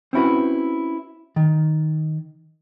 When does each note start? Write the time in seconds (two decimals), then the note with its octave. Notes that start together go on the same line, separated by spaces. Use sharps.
0.13 C4 C#4 E4 F#4 B4
1.36 D#3